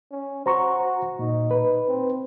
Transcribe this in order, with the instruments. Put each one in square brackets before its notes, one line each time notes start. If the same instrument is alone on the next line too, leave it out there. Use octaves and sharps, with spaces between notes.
[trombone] C#4
[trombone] F#4 [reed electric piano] C5 A#5 C#6
[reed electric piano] A#2 [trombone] D#4
[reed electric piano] B4
[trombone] C4